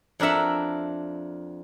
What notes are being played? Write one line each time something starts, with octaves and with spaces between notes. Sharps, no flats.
F2 D4 A#4 E5 F#5